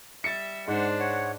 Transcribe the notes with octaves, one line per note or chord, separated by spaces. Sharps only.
G3 E5 A6 C#7
G#2 D4 C5 F#5
C#5 F#5